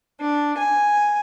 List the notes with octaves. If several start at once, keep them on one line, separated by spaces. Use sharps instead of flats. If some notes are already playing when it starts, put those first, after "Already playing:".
D4
G#5